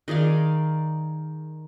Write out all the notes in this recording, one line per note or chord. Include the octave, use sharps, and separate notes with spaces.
D#3 G#4 D5 F5